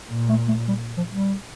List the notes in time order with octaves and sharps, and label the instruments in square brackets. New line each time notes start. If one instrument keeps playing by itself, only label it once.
[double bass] A#2
[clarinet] A3
A3
G3
F3
G3